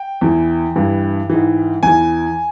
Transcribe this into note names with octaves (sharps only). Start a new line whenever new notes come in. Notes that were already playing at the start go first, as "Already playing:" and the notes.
Already playing: G5
E2 E3
G2 E3
G#2 E3
E2 E3 G#5